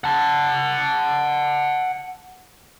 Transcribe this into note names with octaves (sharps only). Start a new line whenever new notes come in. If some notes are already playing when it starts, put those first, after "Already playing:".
F#5 A5